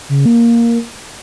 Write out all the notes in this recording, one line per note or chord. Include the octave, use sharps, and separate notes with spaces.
C#3
A#3